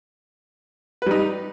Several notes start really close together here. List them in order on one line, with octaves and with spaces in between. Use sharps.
B4 G3 D#4